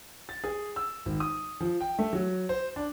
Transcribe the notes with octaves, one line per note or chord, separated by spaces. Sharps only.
A6
G#4
E6
G#1
D#6
F3
G5
A3
F#3
C5
D4